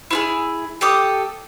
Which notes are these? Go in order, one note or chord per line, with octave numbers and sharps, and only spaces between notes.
E4 F4 G#4
G4 A4 D6 D#6